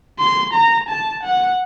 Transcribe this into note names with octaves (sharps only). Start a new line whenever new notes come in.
C6
A#5
A5
F#5